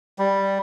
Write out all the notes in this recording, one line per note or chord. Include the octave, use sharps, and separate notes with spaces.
G3